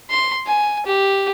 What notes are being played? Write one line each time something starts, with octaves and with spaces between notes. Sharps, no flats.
C6
G#5
G4